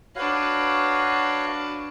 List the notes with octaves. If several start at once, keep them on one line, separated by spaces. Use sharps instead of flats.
D4 F#4 B4 C#5 F5